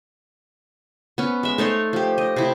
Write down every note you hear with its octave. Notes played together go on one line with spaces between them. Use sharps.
B3 C#4
G#3 E5
A3 D#4 C#5 C6
F3 G4
D#5
C3 E4